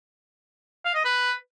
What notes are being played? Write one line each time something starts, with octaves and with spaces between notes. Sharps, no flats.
F5
D#5
B4